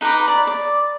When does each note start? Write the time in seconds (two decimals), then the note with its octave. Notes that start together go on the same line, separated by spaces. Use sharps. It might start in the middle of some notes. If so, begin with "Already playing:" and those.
0.01 D#4 B4 A#5 D6
0.28 D5
0.47 D5